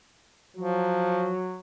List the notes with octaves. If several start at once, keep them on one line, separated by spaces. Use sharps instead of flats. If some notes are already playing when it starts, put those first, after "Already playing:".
F3 F#3